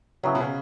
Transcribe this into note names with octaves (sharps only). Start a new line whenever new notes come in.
C#3 F#3 B3 E4 G#4
B2
C#3